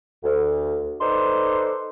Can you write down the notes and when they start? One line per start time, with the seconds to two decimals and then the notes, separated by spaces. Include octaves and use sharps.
0.24 D2
1.00 D#4 A4 B4 C5 D5 C6